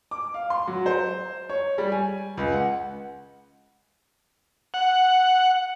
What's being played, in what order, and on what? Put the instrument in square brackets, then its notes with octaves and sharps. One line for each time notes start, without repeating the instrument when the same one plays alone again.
[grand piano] D6
F5
C6
F#3
C5
C#5
G3
G#5
C#2
F#5
[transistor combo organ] F#5